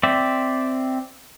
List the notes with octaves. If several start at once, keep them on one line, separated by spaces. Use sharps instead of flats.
C4 D5 E5